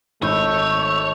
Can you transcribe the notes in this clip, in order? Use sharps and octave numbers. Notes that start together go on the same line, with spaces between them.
G#1 A3 C#5 B5 E6 G6